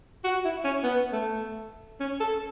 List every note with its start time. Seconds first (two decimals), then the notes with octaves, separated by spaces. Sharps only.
0.24 F#4
0.45 E4
0.64 C#4
0.83 B3
1.12 A3
2.00 C#4
2.20 A4